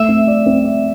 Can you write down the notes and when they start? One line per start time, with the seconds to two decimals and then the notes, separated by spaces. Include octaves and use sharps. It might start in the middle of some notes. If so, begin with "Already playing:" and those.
Already playing: A3 E5
0.08 C4
0.27 D5
0.46 C4
0.64 D5